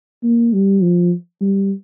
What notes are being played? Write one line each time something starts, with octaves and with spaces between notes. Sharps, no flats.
A#3
G3
F3
G3